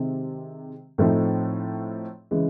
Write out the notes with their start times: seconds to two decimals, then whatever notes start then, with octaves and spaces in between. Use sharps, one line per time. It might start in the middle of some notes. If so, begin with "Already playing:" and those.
Already playing: C3 D#3 G#3 C4
0.98 A2 F3 A3 C4 D#4
2.31 C#3 E3 G#3